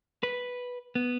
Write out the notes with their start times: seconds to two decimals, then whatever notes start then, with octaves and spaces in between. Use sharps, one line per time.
0.23 B4
0.95 B3